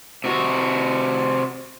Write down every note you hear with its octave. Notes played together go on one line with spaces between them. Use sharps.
C3 F#4